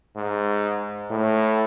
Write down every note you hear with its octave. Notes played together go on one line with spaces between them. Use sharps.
G#2
A2